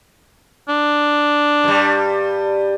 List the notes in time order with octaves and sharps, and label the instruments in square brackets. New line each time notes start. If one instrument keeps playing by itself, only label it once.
[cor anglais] D4
[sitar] G2 G3